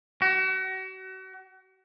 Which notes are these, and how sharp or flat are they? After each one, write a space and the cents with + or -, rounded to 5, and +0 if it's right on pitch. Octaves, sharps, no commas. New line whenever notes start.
F#4 +35